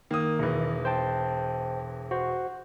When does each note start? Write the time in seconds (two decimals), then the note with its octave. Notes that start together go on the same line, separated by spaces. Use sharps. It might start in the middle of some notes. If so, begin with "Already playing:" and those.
0.11 D#3 A#3 D#6
0.39 E1 E3
0.85 C5 G5 A5
2.11 F#4 C5